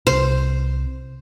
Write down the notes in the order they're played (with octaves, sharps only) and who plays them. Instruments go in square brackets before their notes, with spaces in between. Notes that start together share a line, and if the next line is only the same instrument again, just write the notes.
[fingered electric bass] C2 C3 [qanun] C5